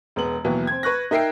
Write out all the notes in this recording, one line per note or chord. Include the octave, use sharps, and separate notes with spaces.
E1 G#3 B3 F#7
D#2 B2 E3 F#3
C4 G#6
B4 C#6 F#6 A#6
D#4 A#4 E5 G5 C7 D7